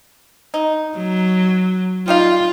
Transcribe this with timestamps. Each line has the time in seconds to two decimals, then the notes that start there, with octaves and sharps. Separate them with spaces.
0.54 D#4
0.96 F#3
2.08 G3 D#4 F4 F5